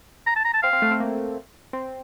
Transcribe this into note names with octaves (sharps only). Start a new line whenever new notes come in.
A#5
A5
A#5
A5
C4 F5
C4
A3
C4
A#3
C4